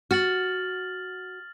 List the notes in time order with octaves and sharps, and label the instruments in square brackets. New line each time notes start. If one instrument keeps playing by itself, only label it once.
[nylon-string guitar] F#4 [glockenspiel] F6 A6 F#7